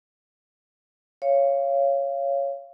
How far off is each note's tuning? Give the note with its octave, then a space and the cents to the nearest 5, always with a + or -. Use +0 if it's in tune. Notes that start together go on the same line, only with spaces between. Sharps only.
C#5 +0 F5 -20